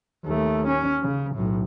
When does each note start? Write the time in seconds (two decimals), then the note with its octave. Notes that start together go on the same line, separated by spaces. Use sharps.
0.24 D#2 A3
0.67 C#4
1.02 C#3
1.34 B1 A2